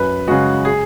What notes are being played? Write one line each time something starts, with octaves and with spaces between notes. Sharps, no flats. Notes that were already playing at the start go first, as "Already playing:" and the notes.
Already playing: F#2 B4
C#3 G#3 F#4
G#4